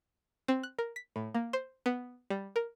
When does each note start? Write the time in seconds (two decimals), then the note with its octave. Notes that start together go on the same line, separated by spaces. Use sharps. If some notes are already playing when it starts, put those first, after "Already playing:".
0.48 C4
0.63 F#6
0.79 A#4
0.96 B6
1.16 A2
1.35 A#3
1.53 C5
1.86 B3
2.30 G3
2.56 A#4